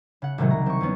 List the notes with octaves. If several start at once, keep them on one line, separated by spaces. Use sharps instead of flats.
C#3 F#5
C2 A2 C3 D#3 F#3 G#3
A#5
C4 C#6
E2 G3 B3 C#4